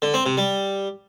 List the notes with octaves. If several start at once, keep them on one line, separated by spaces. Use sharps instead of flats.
D3
C4
C3
G3